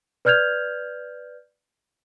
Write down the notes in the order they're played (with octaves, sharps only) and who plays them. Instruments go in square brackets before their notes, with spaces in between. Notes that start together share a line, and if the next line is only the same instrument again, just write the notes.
[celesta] B4 D5 F6 G6 G#6 F7